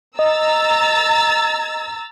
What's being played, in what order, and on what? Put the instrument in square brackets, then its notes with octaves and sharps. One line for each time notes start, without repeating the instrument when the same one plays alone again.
[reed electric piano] D#5 [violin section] A#5 E6 A6